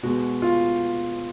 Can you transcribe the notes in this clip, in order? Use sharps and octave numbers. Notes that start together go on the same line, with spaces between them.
B2 G#3 F#4
F4